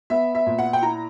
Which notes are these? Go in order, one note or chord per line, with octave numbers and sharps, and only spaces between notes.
B3 E5
E5
A#2
F#5
G5
E4 A#5